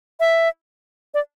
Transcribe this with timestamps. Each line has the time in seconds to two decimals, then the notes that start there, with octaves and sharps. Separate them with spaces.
0.20 E5
1.14 D5